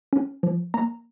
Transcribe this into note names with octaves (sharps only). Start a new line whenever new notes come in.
C#4
F3
A#3 A#5